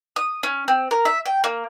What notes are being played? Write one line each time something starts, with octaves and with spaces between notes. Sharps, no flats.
D#6
C#4
C4
A#4
E5
G5
A#3